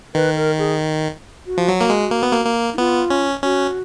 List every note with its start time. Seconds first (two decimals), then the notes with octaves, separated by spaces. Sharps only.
0.15 D#3 B4
0.36 A#4
0.58 G#4
1.46 F#4
1.58 F3
1.68 F#3
1.79 A#3 F#4
1.90 G#3
2.12 A#3
2.23 B3
2.32 A#3
2.46 A#3
2.74 D#4
2.78 B3 F4
3.10 C#4
3.43 C#4 F#4